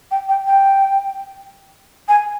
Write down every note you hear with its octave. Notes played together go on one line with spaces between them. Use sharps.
G5
G5
G5
G#5